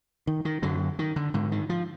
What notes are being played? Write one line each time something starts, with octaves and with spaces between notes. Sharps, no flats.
D#3
D#3
F#2 D3 F#3
D#3
D3
G#2 D3
D#3
F3